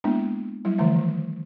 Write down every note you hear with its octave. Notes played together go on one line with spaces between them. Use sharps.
G#3 A#3 B3 D4 E4
F#3 G3 E4
D3 E3 F3 A3 E5
D#3